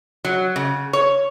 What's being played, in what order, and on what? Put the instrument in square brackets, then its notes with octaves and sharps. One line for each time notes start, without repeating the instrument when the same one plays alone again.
[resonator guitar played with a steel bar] F#3
C#3
C#5